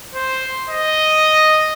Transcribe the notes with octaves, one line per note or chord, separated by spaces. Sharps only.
C5
D#5